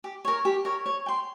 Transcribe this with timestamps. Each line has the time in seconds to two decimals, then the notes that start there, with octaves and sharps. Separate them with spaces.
0.04 G4
0.25 A#4 C#5
0.45 G4
0.65 A#4 C#5
0.86 C#5
1.06 G5 C6